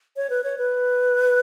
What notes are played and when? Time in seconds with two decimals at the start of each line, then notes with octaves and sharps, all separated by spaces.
0.16 C#5
0.30 B4
0.44 C#5
0.58 B4